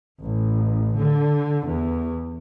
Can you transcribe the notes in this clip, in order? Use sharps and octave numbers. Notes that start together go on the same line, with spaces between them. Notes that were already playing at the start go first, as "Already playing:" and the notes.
A1
D3
E2